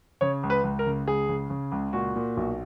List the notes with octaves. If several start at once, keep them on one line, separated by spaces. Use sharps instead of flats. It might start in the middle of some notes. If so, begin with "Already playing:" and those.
C#3 C#5
C#2
B4
C#2
A#4
C#3
C#2 G#4
C#3
C#3
C#2
A#2 F#4
A#2
B1